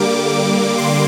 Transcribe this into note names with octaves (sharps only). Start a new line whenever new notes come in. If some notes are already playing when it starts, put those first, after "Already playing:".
Already playing: D3 G3 A#3 D6
C6